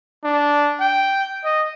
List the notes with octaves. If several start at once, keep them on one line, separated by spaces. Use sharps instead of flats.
D4
G5
D#5